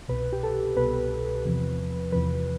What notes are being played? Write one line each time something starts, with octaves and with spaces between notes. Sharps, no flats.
C2 B2 B4
G4
A4
C2 B2 B4
E2 C3 F3
E2 C3 F3 B4